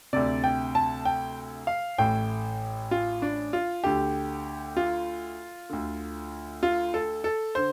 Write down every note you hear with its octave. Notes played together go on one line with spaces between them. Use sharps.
D2 C3 D5
G5
A5
G5
F5
A1 A2 G5
F4
D4
F4
D2 D3 G4
F4
D2 D3
F4
A4
A4
D3 C5